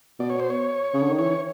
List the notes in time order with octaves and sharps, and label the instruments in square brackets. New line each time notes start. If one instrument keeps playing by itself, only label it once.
[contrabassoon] B2 [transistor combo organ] D5
[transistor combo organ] C#5
C5
C#5
[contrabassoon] C#3
D3
D#3
[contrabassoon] E3 [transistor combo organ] C#5